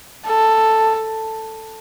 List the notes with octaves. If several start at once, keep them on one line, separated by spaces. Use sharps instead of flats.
A4